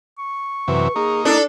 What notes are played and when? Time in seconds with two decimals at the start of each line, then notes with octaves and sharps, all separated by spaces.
0.19 C#6
0.68 F#2 C3 E3 B4
0.96 A#3 D#4 G#4
1.25 D4 E4 A4